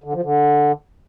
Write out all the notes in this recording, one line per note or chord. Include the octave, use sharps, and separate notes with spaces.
D3
F3
D3